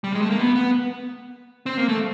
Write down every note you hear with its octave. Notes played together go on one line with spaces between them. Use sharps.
G3
G#3
A3
A#3
B3
B3
C4
A#3
A3